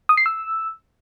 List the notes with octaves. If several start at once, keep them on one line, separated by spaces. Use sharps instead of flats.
D#6
C7
E6